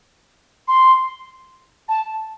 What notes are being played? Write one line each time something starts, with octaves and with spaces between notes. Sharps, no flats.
C6
A5